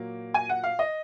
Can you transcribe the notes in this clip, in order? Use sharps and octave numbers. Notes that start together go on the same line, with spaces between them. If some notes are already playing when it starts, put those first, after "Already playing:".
Already playing: A#2 F#3 A#3
G#5
F#5
F5
D#5